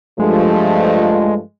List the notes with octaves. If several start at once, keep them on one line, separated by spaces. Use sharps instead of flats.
G2 F3 G#3 A3